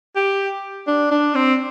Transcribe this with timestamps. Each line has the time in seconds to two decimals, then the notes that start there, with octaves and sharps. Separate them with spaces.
0.16 G4
0.87 D4
1.11 D4
1.35 C4